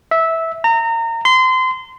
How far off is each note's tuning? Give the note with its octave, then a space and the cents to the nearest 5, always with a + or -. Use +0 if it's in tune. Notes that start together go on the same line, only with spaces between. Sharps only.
E5 -10
A#5 -30
C6 -25